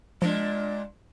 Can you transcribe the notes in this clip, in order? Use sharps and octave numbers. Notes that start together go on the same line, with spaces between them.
A#2 F3 G#3 D4